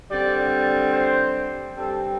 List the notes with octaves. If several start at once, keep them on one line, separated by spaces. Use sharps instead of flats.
D3 G3 C4 D5
C5
G2 G3 C4 A4